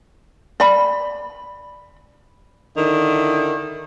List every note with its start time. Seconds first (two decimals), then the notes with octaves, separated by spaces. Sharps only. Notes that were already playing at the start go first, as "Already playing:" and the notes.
0.60 D5 B5
2.76 D3 D#3 E4